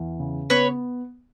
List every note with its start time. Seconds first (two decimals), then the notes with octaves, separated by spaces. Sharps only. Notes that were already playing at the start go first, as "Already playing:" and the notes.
Already playing: E2
0.20 C#3
0.50 B3 B4 C#5